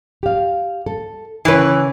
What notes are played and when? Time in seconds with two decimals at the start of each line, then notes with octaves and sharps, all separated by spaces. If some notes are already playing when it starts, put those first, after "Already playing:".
0.23 G4 F5
0.86 A4
1.45 C#3 E3 B4 C#5